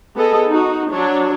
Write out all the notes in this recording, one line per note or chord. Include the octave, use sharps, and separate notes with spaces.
B3 G#4 A4 D#5
D#4 F#4
F#3 D4 C#5